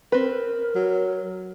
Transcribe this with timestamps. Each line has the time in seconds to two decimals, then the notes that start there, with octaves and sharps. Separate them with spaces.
0.12 C4 A#4 B4
0.75 F#3